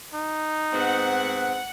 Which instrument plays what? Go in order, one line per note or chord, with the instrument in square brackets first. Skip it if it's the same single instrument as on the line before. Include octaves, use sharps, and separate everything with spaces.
[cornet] D#4
[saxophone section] G#2 B3 C4 [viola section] F#5